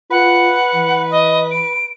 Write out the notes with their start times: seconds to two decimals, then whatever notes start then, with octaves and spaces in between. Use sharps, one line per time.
0.11 F4 B4 F#5
0.74 E3
1.11 D#5
1.51 D7